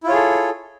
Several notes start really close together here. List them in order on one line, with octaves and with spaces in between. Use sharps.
E4 F4 C#5 G#4 A4